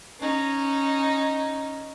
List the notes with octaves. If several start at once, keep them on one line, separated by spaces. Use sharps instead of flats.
C#4 D#4